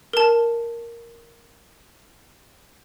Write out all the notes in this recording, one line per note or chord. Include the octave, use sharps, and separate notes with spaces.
A#4 A5